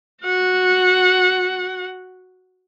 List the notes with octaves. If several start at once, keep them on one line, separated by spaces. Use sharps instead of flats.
F#4 F#5